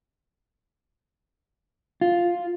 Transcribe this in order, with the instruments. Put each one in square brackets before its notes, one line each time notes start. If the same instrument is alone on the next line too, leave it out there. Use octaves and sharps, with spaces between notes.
[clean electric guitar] F4